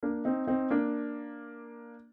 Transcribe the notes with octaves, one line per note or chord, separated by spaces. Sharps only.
A#3 D4
C4 D#4
C4 D#4
A#3 D4